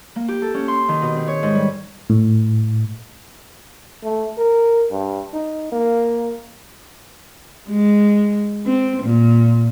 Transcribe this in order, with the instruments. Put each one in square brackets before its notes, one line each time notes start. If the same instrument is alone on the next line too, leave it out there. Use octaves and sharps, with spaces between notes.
[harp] A#3
G4
A4
C#4
C6
D#3
B2
C4
C#5
G#2
G3
[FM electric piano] A2
[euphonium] A3
A#4
G2
D#4
A#3
[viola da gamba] G#3
C4
A#2